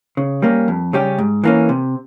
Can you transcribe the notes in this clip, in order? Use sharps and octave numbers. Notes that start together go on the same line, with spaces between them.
C#3
G3 A#3 C#4
F2
C#3 G3 C#4 G4
G#2
E3 A#3 C#4
C3